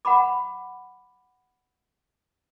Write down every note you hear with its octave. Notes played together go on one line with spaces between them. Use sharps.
F#5 A#5 B5 D6